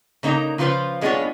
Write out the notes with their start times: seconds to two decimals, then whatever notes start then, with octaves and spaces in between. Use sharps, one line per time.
0.23 C#3 A#3 D#4 C#5 A#5
0.58 C#3 F3 F4 G4 B4 C5
1.01 F#2 G#3 B3 D4 F4 C#5